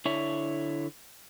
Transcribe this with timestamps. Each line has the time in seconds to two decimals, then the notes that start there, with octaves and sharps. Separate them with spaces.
0.05 D3 E4 C#5